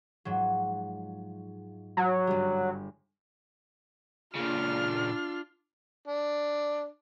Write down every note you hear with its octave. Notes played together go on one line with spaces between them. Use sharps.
G#2 F3 F#3
F#3
G1 G3
A#2 C#3 D4 F4 F6
D4